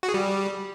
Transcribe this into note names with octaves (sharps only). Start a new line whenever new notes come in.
F#4
G#4
G3